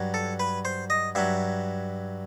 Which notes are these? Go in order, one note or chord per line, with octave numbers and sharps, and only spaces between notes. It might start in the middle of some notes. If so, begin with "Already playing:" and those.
Already playing: G2 F#3
A4
B4
C5
D#5
G2 F#3 E5